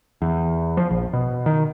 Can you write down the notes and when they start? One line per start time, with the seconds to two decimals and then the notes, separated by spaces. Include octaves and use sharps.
0.22 E2
0.77 F3
0.90 A#1
1.13 B2
1.46 D#3